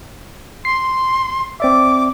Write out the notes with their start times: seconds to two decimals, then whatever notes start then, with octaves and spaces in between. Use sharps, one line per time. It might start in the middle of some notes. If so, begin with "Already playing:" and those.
0.65 C6 C7
1.60 C4 D5 E5 D6